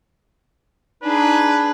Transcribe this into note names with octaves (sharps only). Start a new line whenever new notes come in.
D4 D#4 G#4 B4